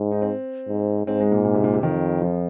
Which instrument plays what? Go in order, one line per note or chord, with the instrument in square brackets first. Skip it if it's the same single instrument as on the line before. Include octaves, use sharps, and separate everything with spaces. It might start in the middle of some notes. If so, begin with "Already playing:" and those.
Already playing: [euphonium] G#2
[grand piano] D#4
C4
[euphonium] G#2
[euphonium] G#2 [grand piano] C4
[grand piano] G#3
A#2
A#2
C3
A#2
C3
[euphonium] F2 [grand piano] D#3
[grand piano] F3